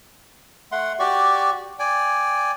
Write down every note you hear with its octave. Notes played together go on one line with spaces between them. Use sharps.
A3 F#5 C6
F#4 G4 D5 C#6
D5 G5 G#5